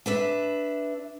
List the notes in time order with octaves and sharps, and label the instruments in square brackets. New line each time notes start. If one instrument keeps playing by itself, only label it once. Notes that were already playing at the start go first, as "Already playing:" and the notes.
[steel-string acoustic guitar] D4 B4 E5